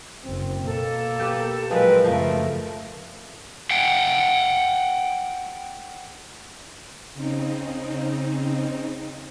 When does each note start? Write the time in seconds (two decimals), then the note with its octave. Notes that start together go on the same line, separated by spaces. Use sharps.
0.24 F#1 C4
0.65 B2 A#3 A4
1.19 G4 B4
1.70 A#2 F3 F#3 G#3 C4 A#4 B4
2.04 F#2 C#3 F3 A3
3.71 F#5 G5
7.14 C#3 C4 D#4